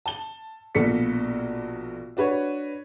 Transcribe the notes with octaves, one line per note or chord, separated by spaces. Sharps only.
A5 G7
A#1 B2 A#3 A4 B6 C#7
D4 F#4 B4 C#5